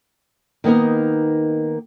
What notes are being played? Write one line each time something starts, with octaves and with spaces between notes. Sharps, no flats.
D#3 A#3 B3 D#4 A#4